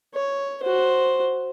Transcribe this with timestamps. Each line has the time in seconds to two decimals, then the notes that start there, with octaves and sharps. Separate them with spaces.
0.14 C#5
0.63 F#4 C5